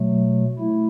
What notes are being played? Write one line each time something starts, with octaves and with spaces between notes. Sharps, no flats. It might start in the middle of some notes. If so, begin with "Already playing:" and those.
Already playing: B2 F#3 A3
A3 E4